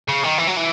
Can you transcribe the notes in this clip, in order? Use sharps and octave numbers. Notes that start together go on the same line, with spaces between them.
C#3
D#3
E3
F#3
E3